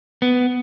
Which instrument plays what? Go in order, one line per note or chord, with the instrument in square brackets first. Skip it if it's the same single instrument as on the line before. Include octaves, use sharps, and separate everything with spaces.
[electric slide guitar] B3